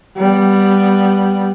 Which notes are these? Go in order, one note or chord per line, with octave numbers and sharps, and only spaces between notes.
G3 B3